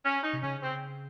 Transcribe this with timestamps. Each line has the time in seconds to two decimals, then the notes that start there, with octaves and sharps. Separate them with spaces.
0.05 C#4
0.24 D#4
0.33 C3
0.43 C#3 C#4
0.62 C4